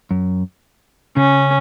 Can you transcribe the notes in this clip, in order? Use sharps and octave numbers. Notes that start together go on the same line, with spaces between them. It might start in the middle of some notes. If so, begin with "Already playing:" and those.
F#2
C#3 C#4